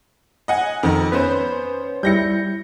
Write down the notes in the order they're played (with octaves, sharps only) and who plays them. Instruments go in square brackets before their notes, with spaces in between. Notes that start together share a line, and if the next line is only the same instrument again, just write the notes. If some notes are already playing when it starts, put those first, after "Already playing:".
[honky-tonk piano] D#5 F#5 G#5
F2 D#3
[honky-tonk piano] B3 C#4 C5 [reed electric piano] B4
[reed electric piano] G3 E4 [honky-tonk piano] G6 A#6 C#7